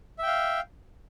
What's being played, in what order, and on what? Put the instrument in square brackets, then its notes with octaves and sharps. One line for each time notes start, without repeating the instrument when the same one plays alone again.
[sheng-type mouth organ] E5
G5
F5